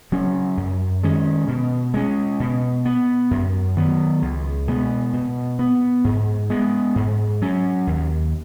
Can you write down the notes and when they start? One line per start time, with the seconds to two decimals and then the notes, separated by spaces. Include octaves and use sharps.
0.12 C#3 F#3 C#4
0.57 F#2
1.03 D#3 G#3 C#4
1.48 B2
1.94 G#3 C#4
2.40 B2
2.85 B3
3.31 F#2
3.76 D#3 F#3 B3
4.22 C#2
4.68 B2 G#3 B3
5.13 B2
5.59 B3
6.04 G#2
6.50 G#3 B3
6.96 G#2
7.42 F#3 C#4
7.87 D#2